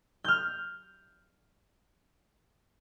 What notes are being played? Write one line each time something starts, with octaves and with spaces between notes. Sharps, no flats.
F6 G6